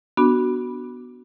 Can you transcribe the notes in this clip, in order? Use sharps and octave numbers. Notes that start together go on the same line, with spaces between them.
B3 D4 F#4